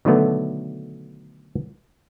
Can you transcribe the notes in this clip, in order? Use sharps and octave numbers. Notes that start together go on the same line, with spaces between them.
B2 D3 D#3 F#3 A3 B3